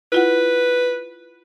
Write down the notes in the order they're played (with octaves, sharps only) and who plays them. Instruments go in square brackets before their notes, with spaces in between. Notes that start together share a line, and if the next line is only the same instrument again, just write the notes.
[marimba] E4 F4 F#5 [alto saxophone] B4